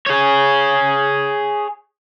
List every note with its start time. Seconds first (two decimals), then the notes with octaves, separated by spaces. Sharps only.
0.06 G#4 C#5